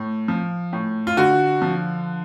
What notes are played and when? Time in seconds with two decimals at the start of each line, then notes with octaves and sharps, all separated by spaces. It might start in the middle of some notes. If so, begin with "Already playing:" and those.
Already playing: A2
0.28 F3
0.73 A2
1.07 F4
1.17 D3 F#4
1.62 F3